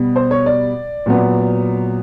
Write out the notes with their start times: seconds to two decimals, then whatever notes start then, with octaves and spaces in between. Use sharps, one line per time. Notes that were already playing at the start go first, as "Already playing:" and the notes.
Already playing: B2 G3
0.16 C5
0.31 C#5
0.46 D5
1.06 A#2 F#3 B3